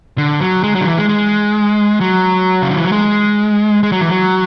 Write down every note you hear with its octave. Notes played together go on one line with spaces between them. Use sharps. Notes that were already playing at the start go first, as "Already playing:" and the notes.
D3
F#3
G#3
F#3
D3
E3
G#3
G#3
F#3
C#3
D3
E3
F#3
G#3
G#3
F#3
E3
F#3